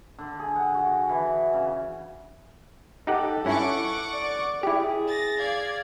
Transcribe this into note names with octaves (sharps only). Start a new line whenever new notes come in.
D3
G#4
F#5
F#4
E3
C#3
D#4 G4 A4 F#5
G2 C#4 E4 F#5 C#6 D6
D5
E4 G4 G#4
A6 A#6
D5 F5 G#6